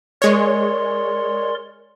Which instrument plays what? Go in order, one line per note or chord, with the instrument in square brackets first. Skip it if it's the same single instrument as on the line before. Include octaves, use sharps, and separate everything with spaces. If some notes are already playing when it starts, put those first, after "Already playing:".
[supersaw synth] G#3 C#5 [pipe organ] A#4 D5 C6